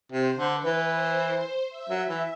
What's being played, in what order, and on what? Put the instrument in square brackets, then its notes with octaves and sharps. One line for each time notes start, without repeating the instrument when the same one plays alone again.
[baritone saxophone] C3 [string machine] C5
[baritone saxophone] D3
[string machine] B4
[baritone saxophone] E3
[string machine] C5
E5
[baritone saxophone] F#3
E3